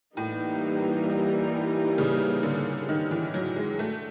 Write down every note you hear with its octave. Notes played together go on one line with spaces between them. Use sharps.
A2 E3 G3 A#3 D#4
C#3
D3
D#3
E3
F#3
G#3
A3 D4 F#4